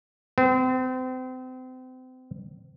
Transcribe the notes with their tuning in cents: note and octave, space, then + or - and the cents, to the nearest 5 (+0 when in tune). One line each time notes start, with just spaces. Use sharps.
C4 -35